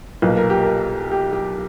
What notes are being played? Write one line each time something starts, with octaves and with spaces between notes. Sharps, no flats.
B1 A#2 A#3 B4
A#4
G4
A#4
G4
G4